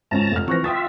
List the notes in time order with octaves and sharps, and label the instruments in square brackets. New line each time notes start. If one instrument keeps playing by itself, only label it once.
[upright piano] G#1 C#2 C#4 [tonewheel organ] A5 A#5
[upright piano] F1 F6
[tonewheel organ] E3 F3 C4 [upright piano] C#6 F#6 A#6
[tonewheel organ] F4 E5 [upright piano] G5 D#6 A6